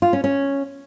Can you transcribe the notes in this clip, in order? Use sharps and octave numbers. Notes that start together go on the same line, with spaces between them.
F4
C#4
C#4